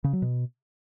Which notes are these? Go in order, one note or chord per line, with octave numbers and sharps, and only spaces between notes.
C#3
F#3
B2